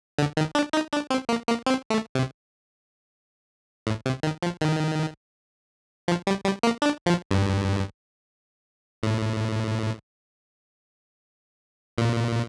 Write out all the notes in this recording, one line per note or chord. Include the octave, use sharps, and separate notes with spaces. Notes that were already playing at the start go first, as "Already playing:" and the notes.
D3
D#3
D4
D#4
D4
C4
A#3
A#3
C4
A3
C3
A2
C3
D#3
F3
D#3
F3
G3
G3
A#3
D4
F3
G2
A2
A#2